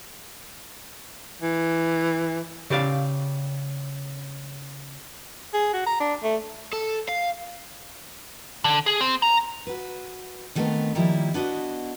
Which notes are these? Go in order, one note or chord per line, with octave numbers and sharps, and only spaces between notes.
E3
C#3 G4 D5 F5
G#4
F#4
A#5
D4
A3
A4
F5
D3
G#4
C4
A#5
F#4 B4
D#3 G3 A3 B3 C4 A#4
D#3 F3 G3 A#3 E4
B3 D4 E4 F#4 D#5